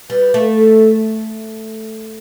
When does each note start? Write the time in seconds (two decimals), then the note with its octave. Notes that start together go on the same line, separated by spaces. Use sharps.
0.10 G3 B4
0.34 A3
0.57 A4